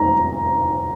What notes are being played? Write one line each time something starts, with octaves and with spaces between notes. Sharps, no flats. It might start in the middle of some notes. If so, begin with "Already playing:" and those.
Already playing: A#5